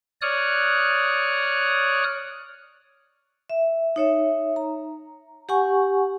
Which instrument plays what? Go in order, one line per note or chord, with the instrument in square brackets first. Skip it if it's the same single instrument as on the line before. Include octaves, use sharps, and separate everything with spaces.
[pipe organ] C#5 D5 D#6 F6 F#6
[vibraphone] E5
D#4 C#5 E5
A#5
G4 F#5 G#5 C#6